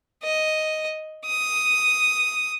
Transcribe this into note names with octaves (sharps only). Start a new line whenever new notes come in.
D#5
D#6